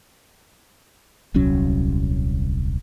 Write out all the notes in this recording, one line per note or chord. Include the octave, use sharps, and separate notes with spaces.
D#1 C2 F#3 C#4